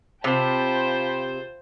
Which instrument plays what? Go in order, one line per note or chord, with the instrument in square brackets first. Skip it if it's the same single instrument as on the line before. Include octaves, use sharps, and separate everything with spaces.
[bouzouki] C3 [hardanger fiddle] F4 C5 [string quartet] G5 A5 B5